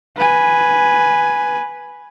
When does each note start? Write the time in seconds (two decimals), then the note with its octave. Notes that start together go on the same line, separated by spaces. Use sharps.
0.17 B4 G#5